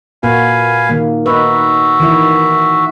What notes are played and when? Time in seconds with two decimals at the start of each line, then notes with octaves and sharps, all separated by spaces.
0.23 A#2 A#3 F#4 B4 F5 G#5
0.89 D#3 A#3
1.26 D#4 F#4 B4 E5
2.00 D#3 E3 E4